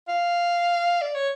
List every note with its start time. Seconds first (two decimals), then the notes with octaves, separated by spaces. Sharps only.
0.08 F5
1.01 D5
1.15 C#5